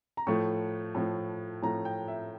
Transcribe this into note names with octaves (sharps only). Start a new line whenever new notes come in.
A#5
A2 F3 A3 C#6
A2 F3 A3
A2 F3 A3 A#5
G5
E5